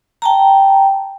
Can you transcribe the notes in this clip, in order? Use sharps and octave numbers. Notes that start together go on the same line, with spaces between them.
G5 A5 A#5